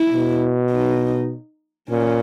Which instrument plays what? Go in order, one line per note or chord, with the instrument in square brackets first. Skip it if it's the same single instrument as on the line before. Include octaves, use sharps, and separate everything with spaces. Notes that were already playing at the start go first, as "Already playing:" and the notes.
Already playing: [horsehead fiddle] E4
[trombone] B2
[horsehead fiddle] D#4
[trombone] A#2 [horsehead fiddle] C#4